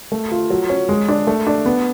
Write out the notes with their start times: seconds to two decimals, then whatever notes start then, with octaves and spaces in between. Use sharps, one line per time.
0.12 A3
0.31 F4
0.50 F#3
0.69 C#4
0.89 G#3
1.08 D4
1.27 A3
1.47 D4
1.66 B3